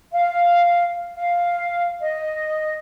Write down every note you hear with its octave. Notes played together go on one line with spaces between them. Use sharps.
F5
F5
D#5